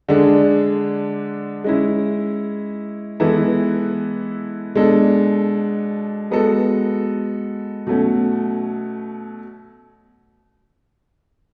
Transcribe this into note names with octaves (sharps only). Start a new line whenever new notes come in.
D3 G#3 D4 G#4
G#3 C#4 E4
E3 G#3 B3 E4 A4
B2 G#3 D4 A4
G#3 B3 F#4 A4
B2 F#3 A3 C#4